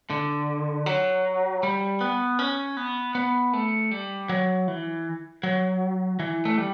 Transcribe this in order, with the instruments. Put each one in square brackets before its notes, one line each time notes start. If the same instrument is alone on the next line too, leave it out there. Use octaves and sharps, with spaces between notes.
[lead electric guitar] D3
F#3
G3
B3
C#4
B3
B3
A3
G3
F#3
E3
F#3
E3
A3
G3